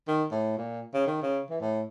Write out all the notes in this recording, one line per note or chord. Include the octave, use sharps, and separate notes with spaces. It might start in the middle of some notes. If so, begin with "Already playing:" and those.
D#3
A2
A#2
C#3
D#3
C#3
E3
A2